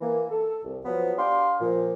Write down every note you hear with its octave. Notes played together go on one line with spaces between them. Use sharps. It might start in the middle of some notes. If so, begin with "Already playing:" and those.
E3 A#3
A4
C2
F3 F#3 B3
D4 G4 D5 F5 G5 C6
A#2 F3